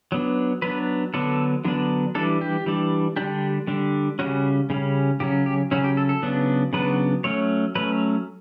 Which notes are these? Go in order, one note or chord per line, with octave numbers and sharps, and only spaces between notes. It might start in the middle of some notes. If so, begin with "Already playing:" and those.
F#3 B3 D4
F#3 B3 D4 B4
D3 F#3 B3 D4 A4
D3 F#3 B3 D4
E3 G3 D4 A4
G4
E3 G3 D4
D3 G3 D4 G4
D3 G3 D4
C#3 G3 C#4 F#4
C#3 G3 C#4
C#3 F#3 C#4 G4
G4
C#3 F#3 C#4 F#4
G4
A4
A4
C#3 F#3 B3 D4
C#3 F#3 B3 D4 B4
F#3 A3 C#4 C#5
F#3 A3 C#4 B4